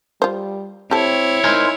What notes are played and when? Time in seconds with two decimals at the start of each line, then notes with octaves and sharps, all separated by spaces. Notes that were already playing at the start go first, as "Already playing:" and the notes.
0.22 G3 F4 C5
0.91 C4 E4 G4 A4 C#5
1.44 D#4 A#4 C5 G#5